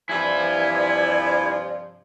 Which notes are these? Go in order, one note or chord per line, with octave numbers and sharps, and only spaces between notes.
G2 C3 F3 E4 B4 D5 G#5